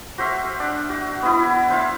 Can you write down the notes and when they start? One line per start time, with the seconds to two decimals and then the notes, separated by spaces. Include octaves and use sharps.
0.18 F#4 C5 E5 F5
0.60 D4
0.89 F#4
1.22 B3 E4
1.70 C5 E5 F5